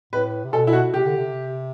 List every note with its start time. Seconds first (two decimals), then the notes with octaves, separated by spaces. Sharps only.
0.13 A2 B4
0.44 C3
0.53 B2 A4
0.67 E4
0.73 F#4
0.94 C3 G4
1.06 D3
1.17 C3